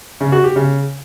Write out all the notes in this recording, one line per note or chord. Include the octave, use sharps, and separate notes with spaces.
C#3
F#4
G4
C#3